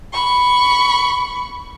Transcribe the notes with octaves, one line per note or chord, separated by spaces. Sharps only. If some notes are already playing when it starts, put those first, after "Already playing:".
B5 C#6